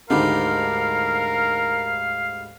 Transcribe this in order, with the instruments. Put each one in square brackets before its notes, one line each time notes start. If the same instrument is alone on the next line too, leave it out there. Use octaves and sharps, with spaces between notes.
[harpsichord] D2 G#2 G3 [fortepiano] D3 D#3 [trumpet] A#4 [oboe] F5